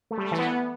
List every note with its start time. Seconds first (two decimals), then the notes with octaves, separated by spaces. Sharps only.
0.11 A3
0.18 G3
0.25 A3
0.32 E3
0.38 B3